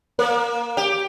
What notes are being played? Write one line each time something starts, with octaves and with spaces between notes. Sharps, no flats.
A#3
G4